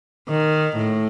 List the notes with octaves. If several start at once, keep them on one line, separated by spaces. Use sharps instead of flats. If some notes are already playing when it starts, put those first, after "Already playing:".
D#3
A2